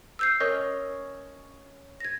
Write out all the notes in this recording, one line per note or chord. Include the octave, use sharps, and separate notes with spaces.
E6 G6 C7
C#4 A#4 C#5 D#5
G#6 A#6